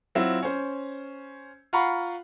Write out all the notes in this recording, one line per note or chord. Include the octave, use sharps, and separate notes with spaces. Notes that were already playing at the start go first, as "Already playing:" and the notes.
F#3 C4 E4 F4
C#4 C5
F4 F5 F#5 A#5 B5 C#6